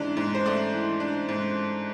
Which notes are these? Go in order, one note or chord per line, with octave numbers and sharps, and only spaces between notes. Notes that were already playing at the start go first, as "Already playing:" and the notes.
Already playing: G#2 E3 D4
G#2
C5
A3 D5
E3
D4
G#2